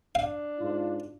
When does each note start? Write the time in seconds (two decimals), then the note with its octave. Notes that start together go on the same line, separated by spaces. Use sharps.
0.15 D4 F5
0.59 G#2 F4